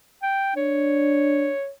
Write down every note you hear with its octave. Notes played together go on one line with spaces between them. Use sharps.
G5
D4 C#5